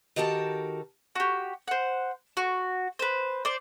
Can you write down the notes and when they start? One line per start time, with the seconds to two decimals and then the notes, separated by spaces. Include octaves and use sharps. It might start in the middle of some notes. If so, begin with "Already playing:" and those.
0.16 D#3 F#4 G4 A4 A#4 A5
1.15 F#4 G4
1.68 C5 F#5
2.37 F#4
2.99 B4 C5
3.45 C5 D5